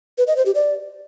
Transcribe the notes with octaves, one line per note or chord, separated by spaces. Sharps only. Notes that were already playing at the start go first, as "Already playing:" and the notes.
B4
D#5
C5
G4
D5